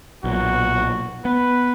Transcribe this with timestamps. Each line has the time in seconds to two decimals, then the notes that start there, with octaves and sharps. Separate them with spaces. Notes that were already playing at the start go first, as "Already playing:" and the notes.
0.24 B1 A#2 F#4
1.25 B3 B4